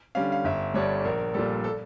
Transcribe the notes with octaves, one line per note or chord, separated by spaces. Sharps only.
D3 G3 C#4 F5
F5
G1 E5
G2 D3 G3 D4 C#5
A#1 A#4
A#2 G3 A4
A4